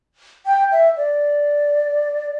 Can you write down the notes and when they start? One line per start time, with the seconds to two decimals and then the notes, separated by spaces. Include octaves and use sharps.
0.46 G5
0.72 E5
0.97 D5